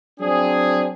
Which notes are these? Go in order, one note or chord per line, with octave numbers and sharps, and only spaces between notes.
F#3 C4 D4 G#4